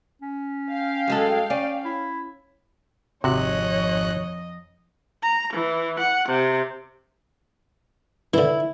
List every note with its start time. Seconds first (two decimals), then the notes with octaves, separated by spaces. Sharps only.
0.22 C#4
0.72 F5 G5
1.08 F#2 G#3 A4
1.50 C#4 D5
1.85 E4
3.24 G#1 F2 C3 F#4 C#5 D#5 F#6
5.22 A#5
5.53 E3
5.99 F#5
6.28 C3
8.34 D3 E3 E4